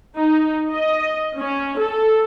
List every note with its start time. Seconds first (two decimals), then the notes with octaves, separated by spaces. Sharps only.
0.17 D#4
0.71 D#5
1.37 C#4
1.79 A4